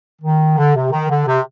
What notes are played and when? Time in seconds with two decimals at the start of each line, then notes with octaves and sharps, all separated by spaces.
0.22 D#3
0.57 D3
0.74 C3
0.91 D#3
1.09 D3
1.26 C3